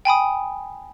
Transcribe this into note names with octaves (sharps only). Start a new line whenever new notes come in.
G5 G#5 B5 D#6